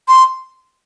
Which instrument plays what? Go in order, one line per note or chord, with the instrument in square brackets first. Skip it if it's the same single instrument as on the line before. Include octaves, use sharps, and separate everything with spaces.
[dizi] C6